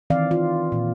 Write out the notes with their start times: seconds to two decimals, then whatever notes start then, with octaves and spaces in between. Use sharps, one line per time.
0.10 D#3 E3 C4 D5 F5
0.31 F4
0.72 A#2